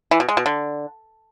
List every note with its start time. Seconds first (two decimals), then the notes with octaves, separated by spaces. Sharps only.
0.11 E3
0.20 B2
0.29 G#3
0.37 B2
0.46 D3